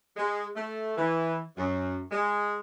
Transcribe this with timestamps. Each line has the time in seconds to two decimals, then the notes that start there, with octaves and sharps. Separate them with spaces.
0.17 G#3
0.55 A3
0.97 E3
1.57 F#2
2.11 G#3